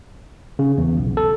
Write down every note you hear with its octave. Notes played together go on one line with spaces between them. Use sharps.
C#3
E2
B1
A4